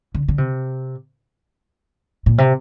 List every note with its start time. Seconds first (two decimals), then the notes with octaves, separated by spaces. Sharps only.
0.15 D3
0.28 D3
0.38 C3
2.26 A#2
2.38 C3